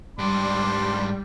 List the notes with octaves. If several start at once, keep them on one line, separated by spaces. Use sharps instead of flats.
G#2 G3 D4 D5 C6